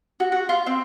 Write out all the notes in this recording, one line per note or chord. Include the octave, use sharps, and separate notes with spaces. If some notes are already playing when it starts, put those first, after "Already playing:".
F#4
F#4
F4
C4